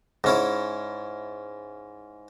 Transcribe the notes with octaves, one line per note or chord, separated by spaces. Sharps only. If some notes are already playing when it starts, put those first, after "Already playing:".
G#2 C#4 E4